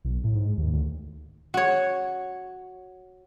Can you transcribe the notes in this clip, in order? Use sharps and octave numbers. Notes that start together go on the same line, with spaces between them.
B1
A2
G#2
D#2
D2
F#4 C#5